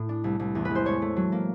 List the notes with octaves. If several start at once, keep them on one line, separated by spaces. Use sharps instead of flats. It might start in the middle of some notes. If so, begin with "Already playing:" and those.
Already playing: A2
D4
C2
C2
E2
B4
G#3
C5
A3 C#5
A3
F#3
A#3